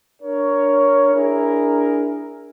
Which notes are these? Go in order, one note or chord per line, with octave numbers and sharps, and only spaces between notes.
D4 A#4 C#5
D4 E4 G#4 A#4